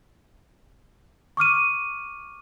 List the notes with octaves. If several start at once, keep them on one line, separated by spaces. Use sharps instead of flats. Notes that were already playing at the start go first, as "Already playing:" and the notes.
C#6 D6 F6 D#7